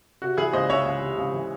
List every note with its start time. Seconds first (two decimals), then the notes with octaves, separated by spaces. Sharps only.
0.22 C3 F#4
0.37 E3 E4 G#4
0.53 C#2 C5 D#5
0.69 C#2 C#5 E5
0.85 C#2
1.01 C3
1.18 C#2
1.34 E3